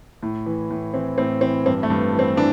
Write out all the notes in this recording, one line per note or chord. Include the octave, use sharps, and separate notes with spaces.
A2
E3
A2
E3 C4
A2 C4
E3 C4
G2 C4
A3
G2
E3
C4
E3 D4